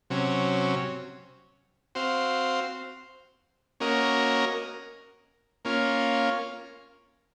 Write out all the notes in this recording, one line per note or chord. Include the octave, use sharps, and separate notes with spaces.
C3 F#3 C#4
C4 F#4 C5 F5
A#3 C#4 F#4 A#4 D#5
A#3 C#4 F4